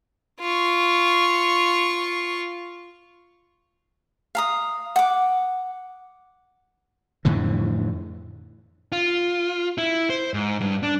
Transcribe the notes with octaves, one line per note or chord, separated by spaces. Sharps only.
F4 C#6
F5 A#5 D#6
F#5 D6
F2 A2 D3 E3
F4
E4
C5
G#2
G2
D4